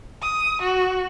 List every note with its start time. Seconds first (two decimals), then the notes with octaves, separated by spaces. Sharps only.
0.22 D#6
0.62 F#4